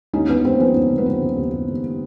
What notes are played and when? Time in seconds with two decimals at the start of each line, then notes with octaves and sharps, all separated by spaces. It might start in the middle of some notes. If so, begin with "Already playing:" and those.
0.13 D#2 C#4 D#4
0.29 D#2 B3 C#4
0.45 D#2 C4
0.60 F3 B3 C#4
0.76 D#2
0.91 C#3
0.98 B3
1.06 F3 C4
1.22 C#3
1.36 D#2
1.52 D#2
1.68 D#2